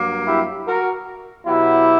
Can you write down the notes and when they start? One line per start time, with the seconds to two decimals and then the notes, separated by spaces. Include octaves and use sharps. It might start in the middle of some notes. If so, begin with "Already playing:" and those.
Already playing: G2 F#3 A#3
0.27 E4 G4
0.68 F#4 A#4
1.46 B2 F#3 B3 E4 G4